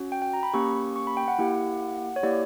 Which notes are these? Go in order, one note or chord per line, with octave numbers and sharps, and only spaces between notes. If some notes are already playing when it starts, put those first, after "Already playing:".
Already playing: C#4 F#4
G5
G5
A#5
B5
A#3 C#4 G4 C#6
C#6
B5
G5
F#5
A#3 E4 G4
C#5
A#3 E4 G4 D5